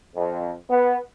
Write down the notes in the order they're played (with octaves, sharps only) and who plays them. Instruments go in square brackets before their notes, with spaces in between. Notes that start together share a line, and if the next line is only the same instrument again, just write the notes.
[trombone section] F2
B3